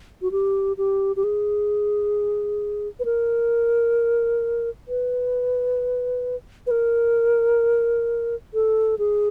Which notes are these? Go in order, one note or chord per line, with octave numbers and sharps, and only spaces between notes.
F#4
G4
G4
G4
G#4
B4
A#4
B4
B4
A#4
A4
G#4